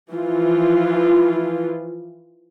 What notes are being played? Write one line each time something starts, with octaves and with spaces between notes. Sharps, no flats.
E3 F3 F4